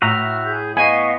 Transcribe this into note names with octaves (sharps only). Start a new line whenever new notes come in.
A2 F#4 E5 A#5 F6
G#4 G6
B3 D#5 F5 G#5 C#6